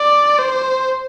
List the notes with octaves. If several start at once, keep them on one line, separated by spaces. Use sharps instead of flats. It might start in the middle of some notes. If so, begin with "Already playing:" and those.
Already playing: D5
C5